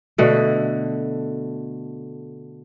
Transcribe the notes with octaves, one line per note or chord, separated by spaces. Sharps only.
B2 D3 A3